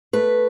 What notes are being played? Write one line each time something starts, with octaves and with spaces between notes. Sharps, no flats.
A3 B4